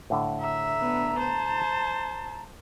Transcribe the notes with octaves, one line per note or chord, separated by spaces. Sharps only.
A2 D3
E5 A#5
B3 D4
C5 A5